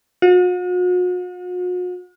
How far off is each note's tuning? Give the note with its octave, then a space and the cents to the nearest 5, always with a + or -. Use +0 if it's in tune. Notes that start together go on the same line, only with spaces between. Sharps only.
F#4 -45